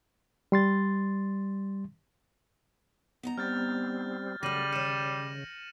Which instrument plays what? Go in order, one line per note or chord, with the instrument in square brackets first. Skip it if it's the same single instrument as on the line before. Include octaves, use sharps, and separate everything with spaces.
[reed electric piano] G3 C6 A6
[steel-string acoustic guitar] B3 D#4 A#5
[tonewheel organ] G3 C4 [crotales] F6 G6 A6
[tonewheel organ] C#3 [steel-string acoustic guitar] F#3 A3 [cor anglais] G3 [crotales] A#6 D#7 F#7
[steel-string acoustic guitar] D#3 C#5 [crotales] C#7 D#7 E7